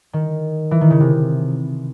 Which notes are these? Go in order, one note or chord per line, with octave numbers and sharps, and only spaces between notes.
D#3
E3
D#3
C#3
C3